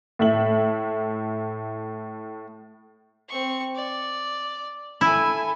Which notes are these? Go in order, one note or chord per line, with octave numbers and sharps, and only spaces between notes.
A2 E5 F#7
C4 C#6
D5
E4 A4 G#5